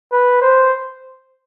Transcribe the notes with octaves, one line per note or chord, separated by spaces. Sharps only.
B4
C5